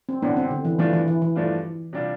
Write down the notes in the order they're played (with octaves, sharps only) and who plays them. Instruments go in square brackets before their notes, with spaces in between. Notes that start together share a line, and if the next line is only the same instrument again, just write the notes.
[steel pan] C4
[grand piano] A1 G2 D3 [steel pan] B3 D4
[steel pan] C4
D3
E3
[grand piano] G2 F3 A3 D4 F4 [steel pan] E3
[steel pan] E3
E3
E3
[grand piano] G2 F3 A3 D4 F4
C3 G3 D4 F4